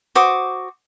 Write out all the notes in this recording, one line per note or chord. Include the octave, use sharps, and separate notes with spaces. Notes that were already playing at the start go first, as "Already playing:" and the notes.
F#4 C5 D6 D#6